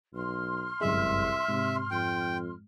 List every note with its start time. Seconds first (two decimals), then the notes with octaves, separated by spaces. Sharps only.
0.14 B1 C6 F6
0.81 G1 C2 F#2 G#3 E5
1.48 G#2 C3
1.91 F2 G5